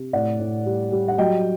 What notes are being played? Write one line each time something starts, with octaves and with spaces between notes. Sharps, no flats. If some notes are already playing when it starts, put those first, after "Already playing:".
Already playing: C3
A2 D5 F#5
A2
G3
G3
F#5
F#3 D#5 G5